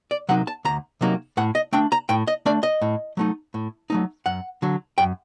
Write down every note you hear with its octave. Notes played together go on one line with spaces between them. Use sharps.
D5
C3 F#3 A#3 D#4 F#5
A5
D2 A#5
C3 F#3 A#3 D#4
A2 F#5
D#5
A3 D4 G5
A#5
A2 G5
D#5
A3 D4 D5
D#5
A2
F#3 A3 D#4
A2
F#3 A3 D#4
F#2 F#5
D3 F#3
F#2 G5